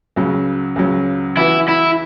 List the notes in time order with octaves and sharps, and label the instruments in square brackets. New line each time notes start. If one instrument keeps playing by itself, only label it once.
[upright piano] C#2 C#3 F#3
C#2 C#3 F#3
[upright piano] E3 B3 F#4 B4 [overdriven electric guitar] E4
[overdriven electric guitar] E4